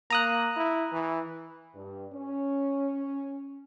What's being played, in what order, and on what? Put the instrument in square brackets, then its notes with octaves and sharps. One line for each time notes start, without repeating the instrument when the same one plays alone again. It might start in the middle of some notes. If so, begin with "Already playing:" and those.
[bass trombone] A#3 [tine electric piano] A#5 D#6 F#6
[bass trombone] E4
E3
[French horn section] G2
C#4